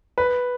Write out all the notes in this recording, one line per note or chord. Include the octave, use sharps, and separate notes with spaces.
B4